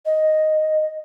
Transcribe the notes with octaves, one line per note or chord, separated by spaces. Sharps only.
D#5